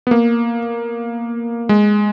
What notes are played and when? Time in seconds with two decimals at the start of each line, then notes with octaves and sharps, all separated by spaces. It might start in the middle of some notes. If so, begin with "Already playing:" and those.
0.07 B3
0.11 A#3
1.69 G#3